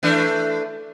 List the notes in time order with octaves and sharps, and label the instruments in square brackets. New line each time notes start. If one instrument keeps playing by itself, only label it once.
[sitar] E3 A3 D4